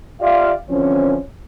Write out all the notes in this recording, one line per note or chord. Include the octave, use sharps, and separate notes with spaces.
F4 G4 D5 E5 F5
D3 E3 F3 C4 C#4